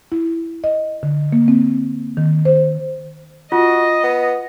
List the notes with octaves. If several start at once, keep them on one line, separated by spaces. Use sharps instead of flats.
E4
D#5
D3
A#3
C4
D#3
C5
F4 F#4 D#5
B3